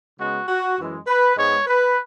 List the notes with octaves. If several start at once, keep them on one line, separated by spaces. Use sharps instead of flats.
C#3 G#3 B3 F#4
F#4
F#2 E3 G#3
B4
G#2 G#3 B3 C#5
B4